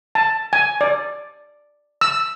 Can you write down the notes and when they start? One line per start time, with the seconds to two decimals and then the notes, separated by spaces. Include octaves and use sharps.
0.15 A5
0.53 G#5
0.81 D5
2.01 E6